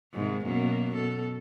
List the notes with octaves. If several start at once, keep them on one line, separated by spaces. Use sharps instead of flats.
G#2 C3 D#3
F#2 B2 A#3
B2 A4